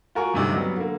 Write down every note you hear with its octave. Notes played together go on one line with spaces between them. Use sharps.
F4 F#4 A#4 G#5 C#6
D2 G2 C3 D#4
F#3 G3 B3
D3 A#3